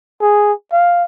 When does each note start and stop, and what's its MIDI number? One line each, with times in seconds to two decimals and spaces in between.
0.22 0.52 68
0.72 1.04 77